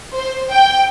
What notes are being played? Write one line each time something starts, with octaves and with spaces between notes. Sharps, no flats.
C5
G5